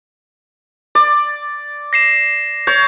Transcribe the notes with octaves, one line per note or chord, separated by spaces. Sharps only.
D5
A#6 C7 E7
C#5 G6